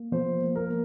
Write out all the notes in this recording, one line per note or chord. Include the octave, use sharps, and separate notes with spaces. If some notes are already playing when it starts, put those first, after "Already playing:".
Already playing: A#3
F3 C5
A#3
A#4
A#3